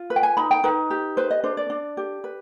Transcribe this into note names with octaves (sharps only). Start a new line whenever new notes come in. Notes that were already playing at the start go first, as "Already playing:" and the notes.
Already playing: F4
B4
G5
G#5
D#4 B5
G5
D#4 B4
G4
B4 C5
D#5
D4 C5
D5
D4
G4
B4